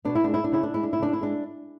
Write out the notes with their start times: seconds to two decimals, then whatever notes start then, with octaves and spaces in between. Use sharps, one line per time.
0.05 B2 D4
0.15 E4
0.24 G#3 D4
0.34 E4
0.44 D4
0.52 C#3 E4
0.63 D4
0.74 G#3 E4
0.83 D4
0.93 E4
0.99 C#3 D4
1.13 E4
1.21 G#3 D4